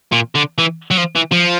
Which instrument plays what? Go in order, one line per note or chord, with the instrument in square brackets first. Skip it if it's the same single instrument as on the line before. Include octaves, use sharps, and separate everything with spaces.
[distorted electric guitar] A#2
D3
E3
F#3
F3
E3
F3